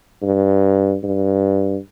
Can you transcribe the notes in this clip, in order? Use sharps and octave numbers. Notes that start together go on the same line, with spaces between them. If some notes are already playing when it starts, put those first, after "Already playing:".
G2
G2